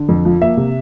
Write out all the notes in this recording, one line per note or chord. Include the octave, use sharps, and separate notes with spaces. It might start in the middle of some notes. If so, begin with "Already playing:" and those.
Already playing: D3
F2
F3
A#3 E5
C3